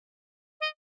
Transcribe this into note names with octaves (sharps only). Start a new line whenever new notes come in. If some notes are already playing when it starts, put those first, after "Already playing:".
D#5